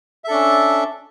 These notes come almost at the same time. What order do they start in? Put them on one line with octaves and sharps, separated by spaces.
E5 A4 D4 C#4